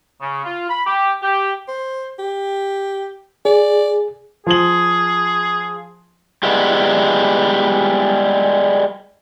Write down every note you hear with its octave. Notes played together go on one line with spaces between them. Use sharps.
C#3
F4
B5
G4
G4
C5
G4
G#4 D5
F3 G#4 F#7
G3 G#3 B3 E4